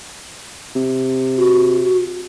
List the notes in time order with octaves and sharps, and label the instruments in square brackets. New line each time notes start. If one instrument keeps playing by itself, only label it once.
[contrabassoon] C3
[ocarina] F#4